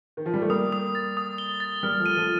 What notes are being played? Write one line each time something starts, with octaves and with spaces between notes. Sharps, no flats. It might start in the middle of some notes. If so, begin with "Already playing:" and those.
D#3
F3
G3
A3
G3 A#3 D#6
D#6
A6
D#6
G7
A6
G3 A#3 F6
F3 A3
D#7
F3 A3